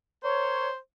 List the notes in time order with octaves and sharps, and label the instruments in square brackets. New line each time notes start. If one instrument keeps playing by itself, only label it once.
[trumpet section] A#4 C#5 [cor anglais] C5